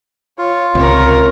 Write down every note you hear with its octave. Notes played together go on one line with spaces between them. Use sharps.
F4 C#5
C#2 C3 A#4 C#5